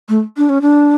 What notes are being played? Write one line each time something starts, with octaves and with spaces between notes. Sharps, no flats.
A3
D4
C#4
D4